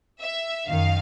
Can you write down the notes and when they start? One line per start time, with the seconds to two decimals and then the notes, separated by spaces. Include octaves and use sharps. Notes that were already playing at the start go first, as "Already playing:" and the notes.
0.21 E5
0.67 F#2 D#3 F5